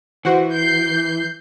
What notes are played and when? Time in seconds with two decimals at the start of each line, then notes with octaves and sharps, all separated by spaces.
0.25 E3 F#4 C5 F#5
0.54 G6 C7